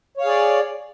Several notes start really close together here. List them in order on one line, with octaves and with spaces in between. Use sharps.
C#5 F5 G#4 D5